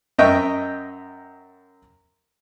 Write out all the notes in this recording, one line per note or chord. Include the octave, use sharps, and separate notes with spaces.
F#2 D#5 E5 G5 C#6